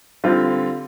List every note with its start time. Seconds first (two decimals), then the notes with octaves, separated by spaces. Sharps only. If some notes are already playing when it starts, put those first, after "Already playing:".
0.24 D3 G3 C4 F4